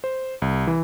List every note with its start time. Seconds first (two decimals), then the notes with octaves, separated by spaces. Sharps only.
0.04 C5
0.42 C2
0.67 E3